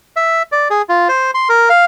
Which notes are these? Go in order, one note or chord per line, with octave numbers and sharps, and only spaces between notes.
E5
D5
G#4
F4
C5
C6
A#4
F5